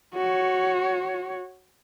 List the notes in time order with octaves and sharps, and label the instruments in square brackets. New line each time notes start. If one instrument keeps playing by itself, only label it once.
[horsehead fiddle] F#4 C#5